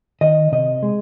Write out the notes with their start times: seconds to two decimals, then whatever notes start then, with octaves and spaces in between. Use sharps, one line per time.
0.21 D#3 D#5
0.52 C3 D#5
0.83 G#3